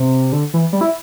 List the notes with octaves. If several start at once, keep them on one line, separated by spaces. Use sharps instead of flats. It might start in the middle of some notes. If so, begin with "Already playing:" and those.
Already playing: C3
D3
E3
G3
E4